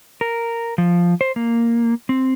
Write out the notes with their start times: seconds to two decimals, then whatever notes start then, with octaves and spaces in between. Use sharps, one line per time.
0.21 A#4
0.78 F3
1.21 C5
1.36 A#3
2.09 C4